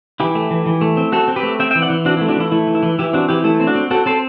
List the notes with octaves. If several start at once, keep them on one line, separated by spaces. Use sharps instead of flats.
E3 E4 G4
A3
E3
E3
A3
C4
C4 F#4 A4
C4
G4 B4
A3
C4 E5 G5
E5 G5
E3
D5 F#5
E3
C4 D4 F#4
E4
A3
D4 F#4
E3 E4
A3 E4
E3
E4
E3
E3 E4 G4
C4 D4 F#4
E3 E4 G4
A3 E4
C4
D4 F#4
C4
C4 F#4 A4
C4 A4 C5